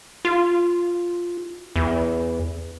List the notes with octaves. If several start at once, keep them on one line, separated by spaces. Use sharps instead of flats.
F4
E2